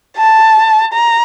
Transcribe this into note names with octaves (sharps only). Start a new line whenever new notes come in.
A5
A#5